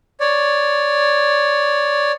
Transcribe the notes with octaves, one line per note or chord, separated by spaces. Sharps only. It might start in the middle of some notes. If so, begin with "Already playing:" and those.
C#5 D5